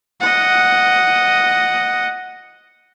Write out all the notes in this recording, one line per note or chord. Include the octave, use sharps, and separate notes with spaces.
D#5 F#5